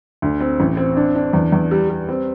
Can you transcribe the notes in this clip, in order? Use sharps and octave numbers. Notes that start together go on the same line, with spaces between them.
D2
C4
A1
C4
D4
D4
E2
E2
G3
G3
C4